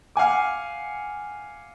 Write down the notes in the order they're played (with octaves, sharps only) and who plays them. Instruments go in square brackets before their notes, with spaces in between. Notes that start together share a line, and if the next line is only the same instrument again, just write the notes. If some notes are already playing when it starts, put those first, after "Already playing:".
[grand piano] F5 F#5 G#5 D6